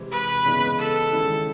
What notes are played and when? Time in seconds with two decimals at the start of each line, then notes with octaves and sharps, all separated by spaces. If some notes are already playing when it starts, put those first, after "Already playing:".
Already playing: C3 E3 G#3 C4 E4
0.12 B4
0.45 C#3 E3 G#3 B3 D#4
0.79 A4
1.11 D#3 G#3 C#4 E4 G#4